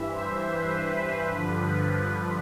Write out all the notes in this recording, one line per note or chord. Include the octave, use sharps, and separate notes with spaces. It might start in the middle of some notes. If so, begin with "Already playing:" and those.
Already playing: G2 E3 E5
C5
B4
G2 D3 F3